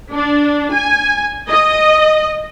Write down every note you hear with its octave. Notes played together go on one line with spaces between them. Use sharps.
D4
G#5
D#5